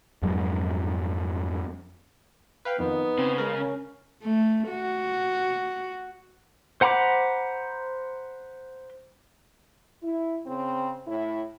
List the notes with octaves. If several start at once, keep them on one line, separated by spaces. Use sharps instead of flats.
F2 G#2 F#3 G#3
B4 F5 G5
F2 D#3 B3 D#4
C#3 C4
G#3 A#4
C#4
A3
F#4
C5 F#5 A#5 B5 D6
E4
C#3 C4
A2 E4